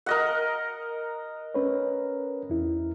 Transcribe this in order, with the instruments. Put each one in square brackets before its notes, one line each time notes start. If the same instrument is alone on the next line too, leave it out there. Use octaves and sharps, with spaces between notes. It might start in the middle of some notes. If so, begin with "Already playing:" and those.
[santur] A#4 D#5 F#5
[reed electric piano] C#4 B4 C#5
E2 E4